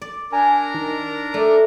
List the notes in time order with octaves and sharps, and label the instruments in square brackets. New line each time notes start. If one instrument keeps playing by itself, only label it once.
[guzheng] D5
[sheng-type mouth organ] D4 A#4 A#5 [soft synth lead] G#5
[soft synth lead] D#3
[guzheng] A3 [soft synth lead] D5